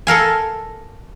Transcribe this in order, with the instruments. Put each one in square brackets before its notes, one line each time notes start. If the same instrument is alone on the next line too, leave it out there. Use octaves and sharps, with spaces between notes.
[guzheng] A4 A#4 F5 G#5